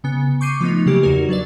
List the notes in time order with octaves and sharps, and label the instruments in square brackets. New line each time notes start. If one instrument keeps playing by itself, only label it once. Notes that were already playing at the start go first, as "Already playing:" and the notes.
[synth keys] C#3 B3
C#6 D6 G6 C7 C#7 D#7
F3 A3 B3 D#4
C#3 F#3 A#3 G4
E2 D#4 F#4 A#4
F#3 D4 B4 D5